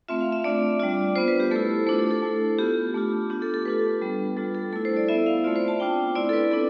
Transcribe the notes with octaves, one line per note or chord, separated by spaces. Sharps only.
A3 C4 F4 E5
F5
E5
A3 D4 F4 D5
G3 D4 F4 D5
B3 F4 C5
B4
G4
A3 E4 A4
A3 D4 F4 C5
A4
A4
A3 E4
B3 F4 G4
A3 D4 F4
B3 D4 F4 G4
A4
A4
A3 D4 F4 B4
G3 B3 F4
G3 D4 F4 A4
A4
A3 E4 A4
C5
D5
B3 E4 E5
F5
A3 C4 F4 D5
C5
A5
B3 D4 F4 G5
A3 C4 E4 D5
A4
B4
B3 D4 A4